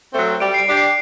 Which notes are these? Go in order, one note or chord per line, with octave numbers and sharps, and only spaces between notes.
F#3 A3 C4
G3 D7
C7
D7
D4 G4
C7